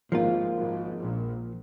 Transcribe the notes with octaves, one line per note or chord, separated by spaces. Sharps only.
G#1 G#2 F3 A#3 F4
G#1 G#2
A#1 A#2